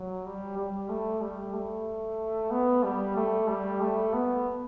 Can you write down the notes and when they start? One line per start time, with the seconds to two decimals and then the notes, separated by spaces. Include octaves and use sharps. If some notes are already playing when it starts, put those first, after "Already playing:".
Already playing: F#3
0.25 G3
0.58 G3
0.89 A3
1.22 G3
1.54 A3
2.51 B3
2.83 G3
3.16 A3
3.48 G3
3.81 A3
4.14 B3